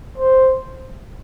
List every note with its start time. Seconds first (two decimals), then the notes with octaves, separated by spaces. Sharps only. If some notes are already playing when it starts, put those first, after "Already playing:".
0.18 C5